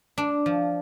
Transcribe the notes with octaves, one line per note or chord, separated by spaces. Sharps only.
D4
F3